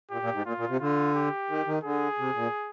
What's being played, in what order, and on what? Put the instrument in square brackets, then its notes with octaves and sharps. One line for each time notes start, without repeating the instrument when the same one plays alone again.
[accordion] A#2 [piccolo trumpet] G4
[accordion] A#2
G#2
[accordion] A#2 [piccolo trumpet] F4
[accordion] A#2
C3
[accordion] D3 [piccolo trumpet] F4
[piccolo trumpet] G4
[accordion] D#3
D#3
[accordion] D3 [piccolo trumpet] G#4
[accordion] C3
A#2